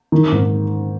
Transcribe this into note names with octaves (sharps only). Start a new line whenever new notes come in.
D#3
G#2